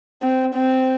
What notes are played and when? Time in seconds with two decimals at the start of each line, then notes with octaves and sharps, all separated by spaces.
0.22 C4
0.55 C4